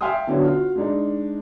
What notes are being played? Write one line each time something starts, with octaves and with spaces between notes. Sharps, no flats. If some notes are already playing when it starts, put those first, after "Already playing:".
E5 F5 G5 G#5 C6 D#6
D3 F#3 B3 C#4 D4 F#4
F4 F#4
G#3 D4 D#4